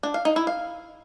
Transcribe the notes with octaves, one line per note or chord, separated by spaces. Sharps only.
D4
F5
D#4
E4
F5